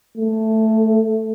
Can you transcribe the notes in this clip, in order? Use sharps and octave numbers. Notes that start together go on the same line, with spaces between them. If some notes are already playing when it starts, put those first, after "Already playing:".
A3